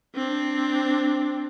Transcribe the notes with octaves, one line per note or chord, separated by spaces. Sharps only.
C4 D4